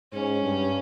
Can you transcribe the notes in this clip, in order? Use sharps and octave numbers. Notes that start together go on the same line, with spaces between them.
G#2 C#4
G2